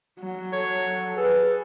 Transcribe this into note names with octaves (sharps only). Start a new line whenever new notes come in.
F#3
A4 C#5
G#4 A4 B4